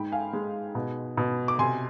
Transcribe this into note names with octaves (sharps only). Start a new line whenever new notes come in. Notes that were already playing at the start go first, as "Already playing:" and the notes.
Already playing: G#2 G#3 G5 B5
F5 G#5
G#3
B2
B2
D6
C3 G#5 C6